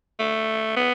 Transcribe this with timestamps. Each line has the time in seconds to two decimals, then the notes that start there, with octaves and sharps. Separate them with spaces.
0.19 A3
0.76 B3